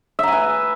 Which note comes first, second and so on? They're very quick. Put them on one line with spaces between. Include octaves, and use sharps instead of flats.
E5 A#5 G#5 B4